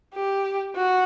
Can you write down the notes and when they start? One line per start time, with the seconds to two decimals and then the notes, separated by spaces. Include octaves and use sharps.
0.14 G4
0.75 F#4